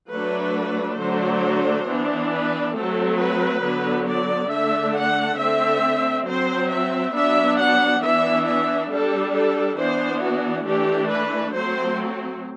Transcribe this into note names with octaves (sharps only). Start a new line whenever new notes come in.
F#3 A3 D4 B4
D3 F#3 A3 D4 C5
E3 B3 D4
B4
F#3 A3 C4 A4
B4
D3 F#3 B3
D5
D3 A3 D4 E5
F#5
D3 A3 C4 E5
F#3 C4 C5
E5
F#3 B3 D4 E5
F#5
E3 B3 D4 E5
E5
G3 D4 A4
A4
E3 B3 D4 C5
F#4
E3 A3 D4 G4
B4
F#3 A3 C4 C5